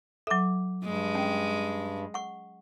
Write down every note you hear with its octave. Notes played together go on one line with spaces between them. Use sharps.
F#3 A4 E5 D6
G2 G#3
C#4 G5
F#5 C#6